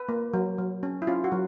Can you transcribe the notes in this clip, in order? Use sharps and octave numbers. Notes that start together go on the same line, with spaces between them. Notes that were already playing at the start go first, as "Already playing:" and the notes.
Already playing: B4
A#3
F#3
F#3
C#4
E4
C#4 F4
F#4
F#3